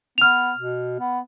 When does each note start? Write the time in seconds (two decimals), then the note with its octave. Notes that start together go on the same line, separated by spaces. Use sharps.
0.18 B3 F6 F7
0.57 B2
0.99 B3